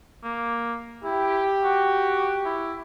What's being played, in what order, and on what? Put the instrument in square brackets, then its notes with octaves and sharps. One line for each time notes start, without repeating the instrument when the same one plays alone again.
[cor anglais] A#3
[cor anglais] E4 [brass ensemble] G4
[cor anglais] F#4
E4